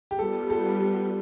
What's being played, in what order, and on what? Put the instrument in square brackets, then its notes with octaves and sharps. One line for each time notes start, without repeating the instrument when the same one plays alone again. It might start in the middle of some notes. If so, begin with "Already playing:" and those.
[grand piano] G4
[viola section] G3 B3 F4 [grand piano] A4
[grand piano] A4